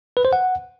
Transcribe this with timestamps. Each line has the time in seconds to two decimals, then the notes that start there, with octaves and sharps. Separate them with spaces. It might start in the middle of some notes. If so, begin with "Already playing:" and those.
0.17 B4
0.25 C5
0.33 F#5